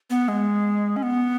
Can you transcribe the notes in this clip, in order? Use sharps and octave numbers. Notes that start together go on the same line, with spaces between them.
B3
G#3
C#4
B3